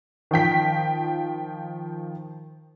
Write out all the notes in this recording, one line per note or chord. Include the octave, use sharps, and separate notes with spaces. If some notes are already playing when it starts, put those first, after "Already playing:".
D#3 F3 G5 B6